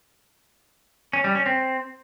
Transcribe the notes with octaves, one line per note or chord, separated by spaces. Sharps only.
C#4
G3
C#4
C4